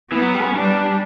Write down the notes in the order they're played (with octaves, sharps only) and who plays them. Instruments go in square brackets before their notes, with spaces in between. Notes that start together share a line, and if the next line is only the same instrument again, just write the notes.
[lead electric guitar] E3 [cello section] B3
[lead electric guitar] F#3
G3
C#4
[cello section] G3 [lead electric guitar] D4